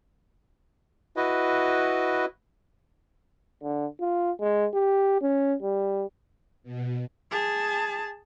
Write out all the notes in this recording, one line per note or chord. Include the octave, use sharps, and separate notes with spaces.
E4 F#4 B4 D#5
D3
F4
G#3
G4
C#4
G3
B2
G#4 A5